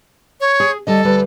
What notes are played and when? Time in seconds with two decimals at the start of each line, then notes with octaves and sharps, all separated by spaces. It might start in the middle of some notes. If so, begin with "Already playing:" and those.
0.40 C#5
0.60 G#4
0.87 D2 G3 A4 D#5
1.05 D2 G3 B4